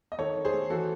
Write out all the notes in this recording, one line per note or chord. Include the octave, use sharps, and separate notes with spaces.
D#5
D#3 A4 C#5
D#3
G#4 C5
A3
E3 F#4 A4